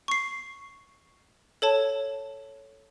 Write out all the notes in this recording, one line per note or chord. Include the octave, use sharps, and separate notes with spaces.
C#6 C7
A4 C#5 A5